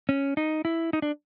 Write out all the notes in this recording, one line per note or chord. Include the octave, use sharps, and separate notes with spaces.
C#4
D#4
E4
D#4
D4